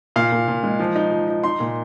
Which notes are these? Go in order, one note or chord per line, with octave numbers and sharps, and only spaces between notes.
A#2 F5
A#2
A#2
G#3
F3
D#4
F3
D#4
D#4 C6
A#2